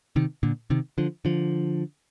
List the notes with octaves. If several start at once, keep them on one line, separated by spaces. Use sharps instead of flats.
C3 D#3
A#2 D3
C3 D#3
D3 F3
D3 F3